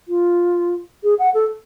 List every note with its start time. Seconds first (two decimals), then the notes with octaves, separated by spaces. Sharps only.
0.08 F4
1.03 G#4
1.19 F#5
1.34 A4